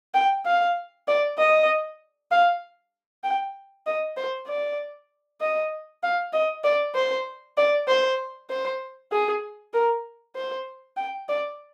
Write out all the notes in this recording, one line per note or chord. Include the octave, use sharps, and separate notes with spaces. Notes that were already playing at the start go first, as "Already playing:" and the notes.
G5
F5
D5
D#5
F5
G5
D#5
C5
D5
D#5
F5
D#5
D5
C5
D5
C5
C5
G#4
A#4
C5
G5
D5